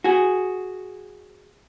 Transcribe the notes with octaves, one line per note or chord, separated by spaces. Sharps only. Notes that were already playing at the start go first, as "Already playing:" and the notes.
F#4 G#4